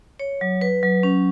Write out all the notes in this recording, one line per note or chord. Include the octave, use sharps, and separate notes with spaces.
C#5
F#3
B4
F#3
C#4